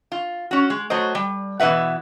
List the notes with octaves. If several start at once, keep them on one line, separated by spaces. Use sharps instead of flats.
F4
C#4 F#4
G#3
F#3 A3 C5 D#5
G3
B2 E3 C#4 B4 E5 F#5